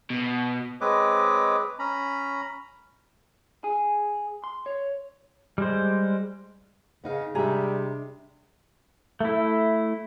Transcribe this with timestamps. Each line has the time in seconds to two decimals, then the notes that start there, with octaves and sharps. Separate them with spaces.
0.10 B2
0.81 G#3 C4 B4 C#5 D#5 D6
1.79 C#4 A#5 B5
3.64 G#4
4.44 C6
4.66 C#5
5.58 G3 G#3 C5
7.04 C#3 B3 D#4 F5
7.35 C3 G3 G#3 D4 G#4 E5 A#5
9.21 A3 E4